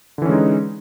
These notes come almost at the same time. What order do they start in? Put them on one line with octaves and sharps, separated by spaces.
D3 E3 C#4 G#3 D#4